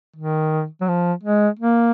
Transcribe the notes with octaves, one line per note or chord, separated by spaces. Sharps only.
D#3
F#3
F3
G#3
A#3